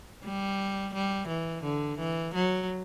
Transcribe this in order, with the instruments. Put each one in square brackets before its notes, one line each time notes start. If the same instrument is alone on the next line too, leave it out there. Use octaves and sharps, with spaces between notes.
[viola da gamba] G3
G3
E3
D3
E3
F#3